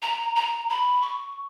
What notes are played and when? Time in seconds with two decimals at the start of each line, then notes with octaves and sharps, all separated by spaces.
0.02 A#5
0.36 A#5
0.69 B5
1.02 C#6